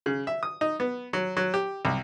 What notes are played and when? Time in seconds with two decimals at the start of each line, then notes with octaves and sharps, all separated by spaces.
0.06 C#3
0.27 E5
0.43 D#6
0.61 D#4
0.80 B3
1.13 F#3
1.37 F#3
1.54 G4
1.85 C2